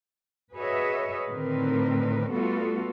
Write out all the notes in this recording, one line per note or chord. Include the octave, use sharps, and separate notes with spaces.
F#4 G#4 B4 C#5 D#5 E5
A2 D3 D#3 C4 A#4 B4
G3 A3 B3 F4 F#4 A4